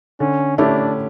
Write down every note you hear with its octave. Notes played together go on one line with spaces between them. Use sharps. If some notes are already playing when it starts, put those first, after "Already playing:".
D3 C#4
A3 C#4 D4 E4 G4